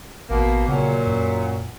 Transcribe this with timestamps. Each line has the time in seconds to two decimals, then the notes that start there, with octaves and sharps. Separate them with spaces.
0.30 A1 B2 A#3
0.68 A#2 C#3 F#3
1.07 F#2